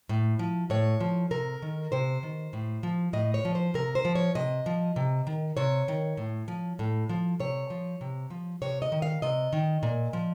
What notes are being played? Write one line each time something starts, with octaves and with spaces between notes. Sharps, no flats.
A2
F3
A2 C#5
F3
C3 A#4
D#3
C3 C5
D#3
A2
F3
A2 D#5
C#5
F3
C5
C3 A#4
C5
F3
C#5
C3 D#5
F3
C3
D#3
C3 C#5
D#3
A2
F3
A2
F3
C3 C#5
F3
C3
F3
C3 C#5
D#5
D#3
F5
C3 D#5
D#3
A#2
F3